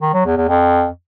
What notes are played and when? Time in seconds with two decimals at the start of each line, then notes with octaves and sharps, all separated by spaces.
0.01 D#3
0.13 F#3
0.25 E2
0.37 E2
0.48 F2